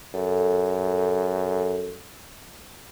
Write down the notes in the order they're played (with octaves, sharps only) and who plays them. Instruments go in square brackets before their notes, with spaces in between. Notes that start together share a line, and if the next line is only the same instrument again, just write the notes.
[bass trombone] F#2 [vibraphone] A4